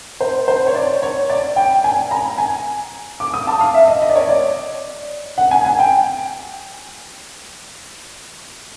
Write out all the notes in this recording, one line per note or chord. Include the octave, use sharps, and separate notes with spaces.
C5
C5
C#5
D5
C#5
D5
G5
G#5
A#5
G#5
D6
D#6
A5
F5
E5
D#5
D#5
D5
C#5
D5
F#5
G#5
G#5
G5